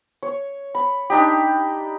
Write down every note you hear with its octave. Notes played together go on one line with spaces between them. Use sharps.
C#5
B5
D4 D#4 G4